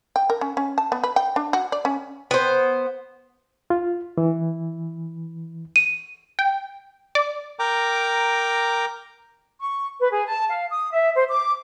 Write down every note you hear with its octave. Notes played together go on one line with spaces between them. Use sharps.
G5
A#4
C#4
C#4
A5
B3
B4
G5
D4
F#4
D5
C#4
B3 C5
F4
E3
D#7
G5
D5
A#4 G5 A#5 D6
C#6
B4
G#4
A5
F5
D#6
E5
C5
D6